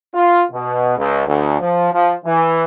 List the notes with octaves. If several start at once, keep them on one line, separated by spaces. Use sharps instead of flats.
F4
B2
C#2
D2
F3
F3
E3